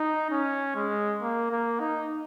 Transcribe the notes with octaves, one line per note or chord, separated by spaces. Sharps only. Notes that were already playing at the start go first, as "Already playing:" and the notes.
Already playing: D#4
C#4
G#3
A#3
A#3
D#4